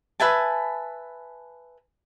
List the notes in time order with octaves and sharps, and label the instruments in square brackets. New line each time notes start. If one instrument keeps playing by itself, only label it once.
[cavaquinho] B4 E5 G#5 A5